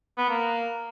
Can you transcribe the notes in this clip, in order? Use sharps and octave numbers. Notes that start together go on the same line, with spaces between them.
B3
A#3